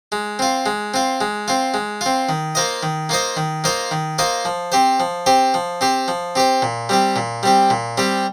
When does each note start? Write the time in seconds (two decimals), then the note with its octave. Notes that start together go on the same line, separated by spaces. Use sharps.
0.12 G#3
0.39 C4 F4
0.66 G#3
0.94 C4 F4
1.21 G#3
1.48 C4 F4
1.74 G#3
2.01 C4 F4
2.29 D#3
2.55 A#3 F4 C5 D#5
2.83 D#3
3.09 A#3 F4 C5 D#5
3.37 D#3
3.64 A#3 F4 C5 D#5
3.91 D#3
4.18 A#3 F4 C5 D#5
4.45 F3
4.72 C4 G4 C5
5.00 F3
5.26 C4 G4 C5
5.54 F3
5.81 C4 G4 C5
6.08 F3
6.36 C4 G4 C5
6.62 A#2
6.89 G3 C4 G4
7.16 A#2
7.43 G3 C4 G4
7.70 A#2
7.97 G3 C4 G4